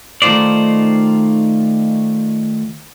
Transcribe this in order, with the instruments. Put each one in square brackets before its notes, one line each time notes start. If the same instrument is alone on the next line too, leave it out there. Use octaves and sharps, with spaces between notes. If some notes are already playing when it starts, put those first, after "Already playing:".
[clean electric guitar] D#3 A3 D#4 F4 C5 D5